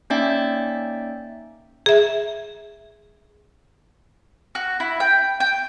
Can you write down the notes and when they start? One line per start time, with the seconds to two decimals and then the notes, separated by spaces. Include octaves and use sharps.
0.10 A#3 C#4 D#4 D5 E5 G5
1.86 G#4 E5
4.55 F#4
4.80 E4
5.00 G5
5.40 G5